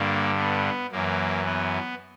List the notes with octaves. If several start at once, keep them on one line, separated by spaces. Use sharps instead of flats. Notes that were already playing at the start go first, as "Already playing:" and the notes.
Already playing: G2 D3 A#3
B3
F#2 E3 A#3
B3